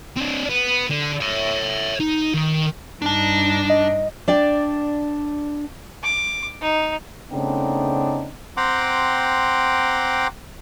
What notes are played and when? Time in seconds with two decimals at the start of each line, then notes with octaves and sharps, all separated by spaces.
0.16 C4 D4
0.49 B3
0.90 D3
1.21 C#5 E5
2.00 D#4
2.34 D#3
3.02 G2 D4 D#4 A5
3.70 D#5
4.28 D4 D5 G5
6.03 D6
6.61 D#4
7.32 C#3 A3 B3 C4 D4 D#4
8.57 C4 F#5 G5 A#5 C6 D6